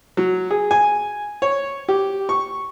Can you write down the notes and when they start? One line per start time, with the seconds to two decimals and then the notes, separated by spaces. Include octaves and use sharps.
0.17 F#3
0.51 G#4
0.71 G#5
1.42 C#5
1.89 G4
2.29 C#6